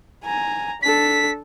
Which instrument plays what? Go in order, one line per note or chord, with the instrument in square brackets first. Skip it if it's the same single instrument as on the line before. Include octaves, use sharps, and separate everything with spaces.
[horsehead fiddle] G#5 A#5
[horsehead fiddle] D4 A4 [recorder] B6